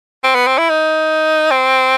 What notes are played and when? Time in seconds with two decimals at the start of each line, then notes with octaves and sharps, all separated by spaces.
0.24 C4
0.35 B3
0.47 C4
0.58 E4
0.70 D#4
1.51 C4